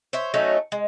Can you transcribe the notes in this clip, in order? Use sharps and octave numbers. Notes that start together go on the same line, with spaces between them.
C5 C#5 E5
F#3 A3 C#4 D#4
G#3